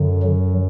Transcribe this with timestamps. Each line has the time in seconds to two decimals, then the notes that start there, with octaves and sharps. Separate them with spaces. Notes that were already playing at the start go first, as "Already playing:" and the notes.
Already playing: F#2 D3
0.23 F#3